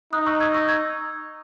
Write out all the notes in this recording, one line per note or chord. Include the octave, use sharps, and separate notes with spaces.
D#4 D#6 F#6
C#6 E6
E6 G#6
C#6 E6
E6 G#6